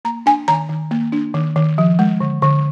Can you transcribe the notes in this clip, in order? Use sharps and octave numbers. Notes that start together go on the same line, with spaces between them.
A#3 A#5
D4 G#5
D#3 A#5
D#3
A#3
D4
D#3
D#3
F3
G#3
D3
D3